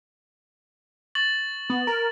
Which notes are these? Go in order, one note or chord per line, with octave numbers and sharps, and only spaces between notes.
C#6 A6 F#7
B3
A#4